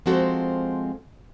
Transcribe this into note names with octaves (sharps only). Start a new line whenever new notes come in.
F3 G#3 C4 F#4 A4 C5